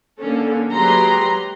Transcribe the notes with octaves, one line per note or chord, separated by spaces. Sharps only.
D3 A#3 C#4 A4
F#3 G#3 G4 B4 A#5 C6